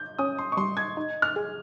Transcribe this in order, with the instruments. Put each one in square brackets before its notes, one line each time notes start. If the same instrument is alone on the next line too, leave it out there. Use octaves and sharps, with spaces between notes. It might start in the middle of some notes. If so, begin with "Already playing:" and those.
Already playing: [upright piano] G6
[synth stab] C#4 [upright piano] D#6
[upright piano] C6
C#6
[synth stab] G3 [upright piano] C6
[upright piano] G#6
[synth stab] D#4
[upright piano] F6
[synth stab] G#4